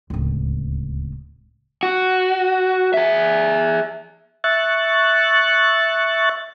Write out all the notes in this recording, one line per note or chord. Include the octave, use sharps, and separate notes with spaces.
D1 C#2
F#4
G#4 E5
E5 C#6 F#6 A6